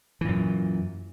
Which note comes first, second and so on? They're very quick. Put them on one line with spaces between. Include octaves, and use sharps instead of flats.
E3 A#2 F#2